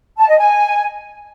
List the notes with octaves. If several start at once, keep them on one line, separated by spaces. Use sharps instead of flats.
A5
D#5
G#5